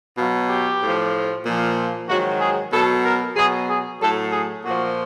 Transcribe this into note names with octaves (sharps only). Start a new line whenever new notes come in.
B2 F#3 F4
G4
A2 F3
A#2
F3
G#2 D#3 F#3 F#4
G#4
B2 F#3 A4
A#4
B2 F#3 G#4
G#4
A2 F#3 A4
G#4
A#2 F3 F#4